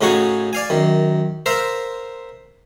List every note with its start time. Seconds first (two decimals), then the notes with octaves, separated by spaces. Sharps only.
0.01 A2 C#3 D#4 F#4 G#4 C#6
0.53 D5 F5 G#5
0.70 F#2 D#3
1.46 A#4 C5 E5 F5